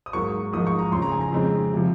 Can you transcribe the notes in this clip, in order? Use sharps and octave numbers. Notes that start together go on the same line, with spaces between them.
D#6
G#2 F#3 A#3 C#6
G#2 F3 A#3 D#4 D#6
C#6
A#5
F2 C#3 F3 C6
A#5
G#5
A#5
F2 C#3 G#3 C4 D#4
C3 F3